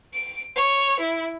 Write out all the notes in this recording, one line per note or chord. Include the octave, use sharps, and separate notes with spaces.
D7
C#5
E4